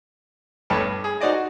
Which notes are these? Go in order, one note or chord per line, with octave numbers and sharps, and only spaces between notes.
G1 G2 A3 C#5 A5 B5
G2
G#4
D#4 F#4 C5 D5 D#5
F#4